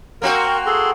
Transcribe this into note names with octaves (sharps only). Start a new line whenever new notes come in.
A#3 C4 F#4 A#4
G#4 A4 C6